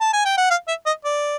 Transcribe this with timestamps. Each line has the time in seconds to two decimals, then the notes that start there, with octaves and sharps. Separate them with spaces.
0.01 A5
0.13 G#5
0.25 G5
0.38 F#5
0.50 F5
0.68 E5
0.86 D#5
1.05 D5